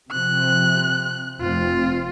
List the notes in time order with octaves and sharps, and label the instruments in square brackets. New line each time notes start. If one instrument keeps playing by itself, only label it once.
[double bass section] C3 F3 C4 [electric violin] F#6
[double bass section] F1 C4 [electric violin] F4